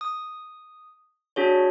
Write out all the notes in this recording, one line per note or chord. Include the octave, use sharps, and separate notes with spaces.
D#6
D4 F#4 G#4 C#5